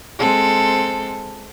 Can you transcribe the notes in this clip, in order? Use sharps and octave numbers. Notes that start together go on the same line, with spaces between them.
G#3 C4 A4